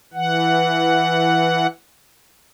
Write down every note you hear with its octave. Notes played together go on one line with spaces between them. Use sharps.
E3 F#5